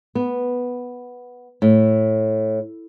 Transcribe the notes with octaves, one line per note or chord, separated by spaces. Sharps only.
B3
A2